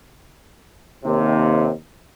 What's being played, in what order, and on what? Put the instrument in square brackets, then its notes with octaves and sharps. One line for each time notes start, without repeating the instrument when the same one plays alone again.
[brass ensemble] D#2 C3